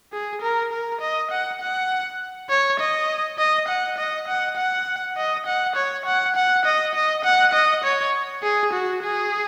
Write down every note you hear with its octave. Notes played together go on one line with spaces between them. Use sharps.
G#4
A#4
A#4
D#5
F#5
F#5
C#5
D#5
D#5
F#5
D#5
F#5
F#5
D#5
F#5
C#5
F#5
F#5
D#5
D#5
F#5
D#5
C#5
G#4
F#4
G#4